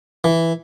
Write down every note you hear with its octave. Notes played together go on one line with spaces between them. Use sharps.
E3